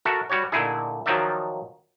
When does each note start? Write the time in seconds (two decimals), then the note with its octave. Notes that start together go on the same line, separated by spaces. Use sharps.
0.05 F#4 A4 A#4 E5
0.30 G3 F#4 G4 C#5
0.52 A#2 D3 A3 D#4 E4 G#4
1.06 D#3 F3 F#3 D#4 D5 E5